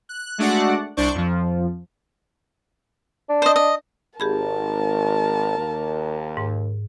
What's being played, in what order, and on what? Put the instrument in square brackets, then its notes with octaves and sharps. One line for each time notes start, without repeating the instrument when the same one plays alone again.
[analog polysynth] F#6
G#3 A3 D4 F#4 D5 F#5
C2 D4 C5 D5 C#6
F2 F3
[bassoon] D4
[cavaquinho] C5 D#5
D#5
[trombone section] G#1 [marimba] G4 G#4 B5 [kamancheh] A#4 A5
[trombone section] D#2
[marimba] G#2